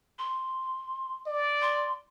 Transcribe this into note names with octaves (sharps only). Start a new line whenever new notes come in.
C6
D5
C6